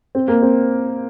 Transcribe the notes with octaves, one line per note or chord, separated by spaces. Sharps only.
C4
A#3
C4